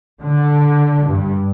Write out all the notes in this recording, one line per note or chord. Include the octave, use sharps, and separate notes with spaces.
D3
G2